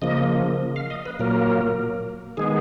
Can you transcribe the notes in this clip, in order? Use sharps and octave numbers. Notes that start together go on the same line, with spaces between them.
C#3 F3 A#3 D#5
F5
D#5
B4
A#2 F#3 A#3 A#4
D#3 G#3 B3 G#4